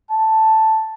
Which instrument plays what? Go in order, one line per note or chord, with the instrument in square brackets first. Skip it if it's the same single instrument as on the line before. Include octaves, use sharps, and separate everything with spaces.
[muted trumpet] A5